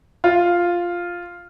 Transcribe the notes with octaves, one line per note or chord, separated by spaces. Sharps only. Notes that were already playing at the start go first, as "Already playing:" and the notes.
F4